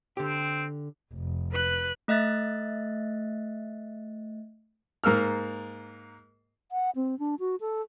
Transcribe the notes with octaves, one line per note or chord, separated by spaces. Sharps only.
D3 C4 G4
F1
B4 F#6
A3 D#5 E5 F#6 A6
G#2 A#3 E6 F6
F#5
C4
D4
F#4
A4